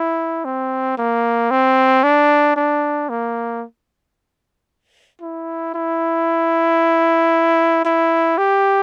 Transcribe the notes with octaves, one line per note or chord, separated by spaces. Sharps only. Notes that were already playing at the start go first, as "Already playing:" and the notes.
Already playing: E4
C4
A#3
C4
D4
D4
A#3
E4
E4
E4
G4